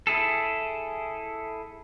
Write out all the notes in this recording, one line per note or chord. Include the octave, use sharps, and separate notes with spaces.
E4 G#4 A4